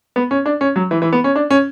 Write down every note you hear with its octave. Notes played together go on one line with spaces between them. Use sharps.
B3
C#4
D4
C#4
F#3
E3
E3
B3
C#4
D4
C#4